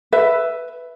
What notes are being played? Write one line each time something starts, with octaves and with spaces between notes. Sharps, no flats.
B4 E5